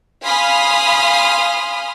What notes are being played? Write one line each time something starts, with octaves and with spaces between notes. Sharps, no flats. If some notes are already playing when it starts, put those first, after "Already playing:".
F5 G#5 B5 C6 D#6 F6